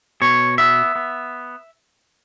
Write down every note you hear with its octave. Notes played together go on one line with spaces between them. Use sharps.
B2 C#5
B3 E5
B3